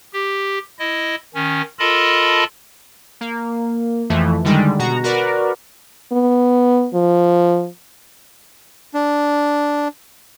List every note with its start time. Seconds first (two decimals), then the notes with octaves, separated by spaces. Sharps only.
0.13 G4
0.79 E4 D#5
1.35 D#3 C#4
1.79 F4 A4 A#4 D#5 A5 B5
3.21 A#3
4.10 F2 E3 F3 A3
4.44 D3 D#3 G3 G#3
4.79 B2 F#4 A#5
5.04 F#4 A#4 B4 D5
6.12 B3
6.94 F3
8.94 D4